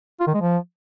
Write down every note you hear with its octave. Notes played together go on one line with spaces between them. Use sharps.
F4
D#3
G#3
F3